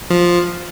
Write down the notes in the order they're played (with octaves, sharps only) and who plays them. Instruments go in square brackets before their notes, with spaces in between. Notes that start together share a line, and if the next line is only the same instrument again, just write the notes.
[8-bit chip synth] F3